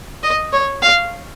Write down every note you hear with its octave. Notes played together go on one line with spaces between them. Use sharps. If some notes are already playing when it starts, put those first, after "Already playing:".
D#5
C#5
F5